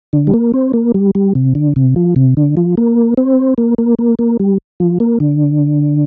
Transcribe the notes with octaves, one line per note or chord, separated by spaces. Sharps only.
D3
G3
A#3
C4
A#3
G3
G3
C3
D3
C3
F3
C3
D3
F3
A#3
C4
A#3
A#3
A#3
A#3
G3
F3
A#3
D3